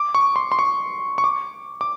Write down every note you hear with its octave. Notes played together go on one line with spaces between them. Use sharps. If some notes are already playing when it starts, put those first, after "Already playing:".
Already playing: D6
C#6
C6
C6
C#6
C#6
D6
D6